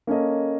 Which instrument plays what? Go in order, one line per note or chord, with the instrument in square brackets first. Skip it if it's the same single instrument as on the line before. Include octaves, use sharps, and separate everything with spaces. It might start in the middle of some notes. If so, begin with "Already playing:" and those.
[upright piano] A#3 C#4 A4 D#5